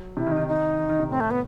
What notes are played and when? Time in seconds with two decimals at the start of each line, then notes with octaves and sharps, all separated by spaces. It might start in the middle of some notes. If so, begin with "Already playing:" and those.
Already playing: F#3
0.17 C3 E4
0.27 D#3
0.32 D#4
0.37 D#3
0.48 D#4
0.79 D#3
0.89 D#3
1.00 C3
1.09 A2 C4
1.20 A3
1.31 B3